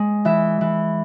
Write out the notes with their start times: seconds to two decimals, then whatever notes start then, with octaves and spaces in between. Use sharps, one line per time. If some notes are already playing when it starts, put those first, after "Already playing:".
Already playing: G#3
0.25 E3 E5
0.61 E3